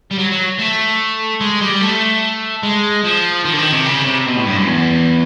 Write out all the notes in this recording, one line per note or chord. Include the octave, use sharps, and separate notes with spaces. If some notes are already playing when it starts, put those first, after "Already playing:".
G3
F#3
F#3
A3
G#3
G3
A3
G#3
F3
D#3
D3
D#3
C3
C#3
C3
B2
A2
G2
F#2
E2